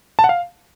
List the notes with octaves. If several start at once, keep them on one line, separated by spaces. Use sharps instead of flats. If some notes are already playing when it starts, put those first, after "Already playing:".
A5
F#5
F5